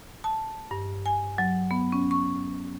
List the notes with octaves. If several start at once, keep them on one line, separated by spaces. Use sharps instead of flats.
A5
G2
G#5
F#3
B3
C#4
C#6